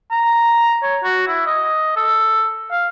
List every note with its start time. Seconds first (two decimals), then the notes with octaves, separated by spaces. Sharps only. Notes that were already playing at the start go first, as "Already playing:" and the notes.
0.11 A#5
0.82 C#5
1.03 F#4
1.27 E4
1.46 D#5
1.96 A4
2.71 F5